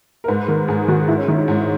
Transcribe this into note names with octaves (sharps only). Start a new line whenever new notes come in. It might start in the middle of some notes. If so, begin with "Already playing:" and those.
A#4
G#2 B4
D#3 A#4
G#2 G#4
D#3 F#4
G#2 E4
C#4
D#3
D#4
G#2 C#4